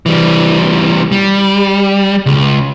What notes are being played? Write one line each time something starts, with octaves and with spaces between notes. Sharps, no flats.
E3 G3
G3
C#2